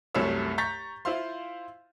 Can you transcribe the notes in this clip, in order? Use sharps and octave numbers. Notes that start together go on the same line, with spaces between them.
C2 F#2 C3 A3 C#5 E6
A#5 C#6 G6 A6 B6
E4 F4 C5 F5 C6